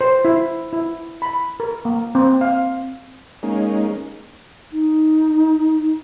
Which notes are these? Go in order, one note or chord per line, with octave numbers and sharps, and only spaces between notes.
C5
E4
E4
B5
A#4
A#3
C4
F5
G#3 A#3 C#4 D#4
D#4